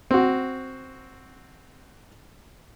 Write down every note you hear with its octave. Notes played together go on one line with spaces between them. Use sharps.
C4 F#4